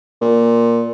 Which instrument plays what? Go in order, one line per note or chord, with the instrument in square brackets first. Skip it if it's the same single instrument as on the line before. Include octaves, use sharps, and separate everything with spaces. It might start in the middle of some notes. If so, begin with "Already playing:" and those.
[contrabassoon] A#2